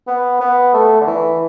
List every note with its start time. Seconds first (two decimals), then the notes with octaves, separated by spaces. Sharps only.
0.07 B3
0.40 B3
0.74 A3
1.01 D3
1.07 E3